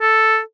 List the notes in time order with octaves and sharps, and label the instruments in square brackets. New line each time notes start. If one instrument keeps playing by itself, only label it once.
[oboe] A4